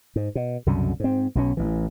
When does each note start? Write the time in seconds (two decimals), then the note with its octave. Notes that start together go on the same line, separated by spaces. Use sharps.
0.16 G#2
0.35 B2
0.66 C2 F#2 B2 D3
1.00 G#2 C4
1.35 B1 B2 C#4
1.57 A1 E3